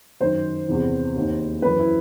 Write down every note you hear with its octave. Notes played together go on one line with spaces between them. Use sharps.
F#2 D#3 C5
E2 C3 E3
D#2 D#3
F#2 E3 B4
E4